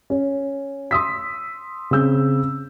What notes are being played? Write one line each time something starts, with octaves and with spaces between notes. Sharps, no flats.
C#4
C6 D#6 E6 B6
C#3 C4 E6 G6